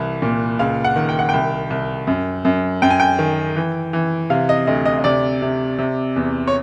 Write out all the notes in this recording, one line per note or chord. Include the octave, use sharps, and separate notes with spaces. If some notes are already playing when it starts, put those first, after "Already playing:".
Already playing: C2 E3
A#2
C#2 F5
F#5
D#3
G5
F#5
C2 G5
C2
F#2
F#2
F#2 G5
G#5
G5
D#3
E3
E3
C3 F5
D#5
D2 D#5
D#5
D#5
C3 D5
C3
C3
E2
C#5